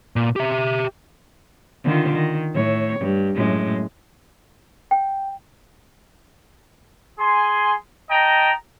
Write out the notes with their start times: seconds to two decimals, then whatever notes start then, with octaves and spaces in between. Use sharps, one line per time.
0.16 A#2
0.36 G4 E5
1.84 D3 D#3 F4
2.14 D#3
2.53 A2 C#5
2.99 G2
3.35 F#2 A2 G#3
4.91 G5
7.19 G#4 G#5 C6
8.10 D#5 G5 A5 A#5